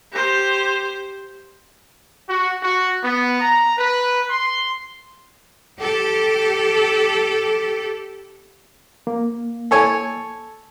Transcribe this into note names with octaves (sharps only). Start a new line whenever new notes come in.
G4 C5
F#4
F#4
B3
A#5
B4
C6
G4 A4
A#3
A4 C#5 G#5